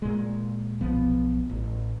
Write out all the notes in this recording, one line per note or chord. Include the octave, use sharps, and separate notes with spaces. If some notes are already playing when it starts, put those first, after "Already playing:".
A#2 G#3
B1 F3 B3
A1